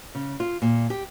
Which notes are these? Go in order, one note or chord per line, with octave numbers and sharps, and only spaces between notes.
C#3
F4
A#2
G4